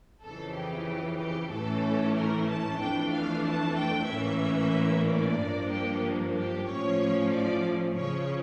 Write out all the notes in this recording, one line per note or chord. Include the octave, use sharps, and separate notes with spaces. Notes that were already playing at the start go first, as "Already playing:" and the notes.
F2 C#3 E3 A4
G4
G4
A2 E3 A3 C#4 A4
A#4
A5
F2 E3 A3 D4 G5
F5
A5
G5
A2 E3 A#3 C#4 E5
D5
G2 F3 A#3 D4
G4
G4
A2 F3 C#4 C#5
D5
C#3 F3 C#4 C#5